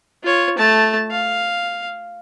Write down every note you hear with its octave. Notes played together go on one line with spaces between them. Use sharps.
F4 C#5
A3 A5
F5